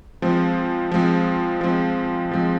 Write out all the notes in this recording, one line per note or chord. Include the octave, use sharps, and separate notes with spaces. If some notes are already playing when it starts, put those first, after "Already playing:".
F3 G#3 C4
F3 G#3 C4
F3 G#3 C4
F3 G#3 C4